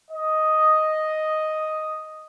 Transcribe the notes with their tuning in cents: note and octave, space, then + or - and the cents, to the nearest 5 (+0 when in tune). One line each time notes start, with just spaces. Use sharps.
D#5 +0